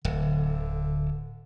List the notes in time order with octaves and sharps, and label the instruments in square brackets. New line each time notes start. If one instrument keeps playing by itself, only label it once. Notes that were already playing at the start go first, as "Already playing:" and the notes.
[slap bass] D1 [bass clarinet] D3